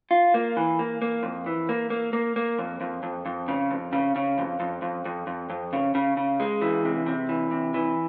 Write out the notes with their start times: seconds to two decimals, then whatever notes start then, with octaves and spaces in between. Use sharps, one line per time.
0.11 F4
0.34 A#3
0.57 E3
0.79 A#3
1.02 A#3
1.23 F2
1.46 E3
1.69 A#3
1.90 A#3
2.13 A#3
2.36 A#3
2.58 F2
2.81 F2
3.03 F2
3.26 F2
3.48 C#3
3.71 F2
3.93 C#3
4.16 C#3
4.38 F2
4.60 F2
4.82 F2
5.05 F2
5.27 F2
5.50 F2
5.73 C#3
5.95 C#3
6.17 C#3
6.40 G#3
6.62 E3
6.85 C3
7.06 C3
7.29 E3
7.51 C3
7.74 E3